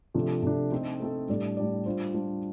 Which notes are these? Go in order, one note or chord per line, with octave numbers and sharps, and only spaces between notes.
C3 F3 A3 D4
C3 F3 A3 D4
A3 C4 D#4 A4
A3 C4 D#4 A4
A2 G3 D4 G4 D5
A2 G3 D4 G4 D5
G3 D4 F4 C5
G3 D4 F4 C5